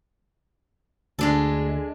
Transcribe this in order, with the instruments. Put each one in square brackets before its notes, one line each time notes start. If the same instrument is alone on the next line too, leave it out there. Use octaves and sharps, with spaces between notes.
[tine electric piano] D2 [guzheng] G#3 D4 A4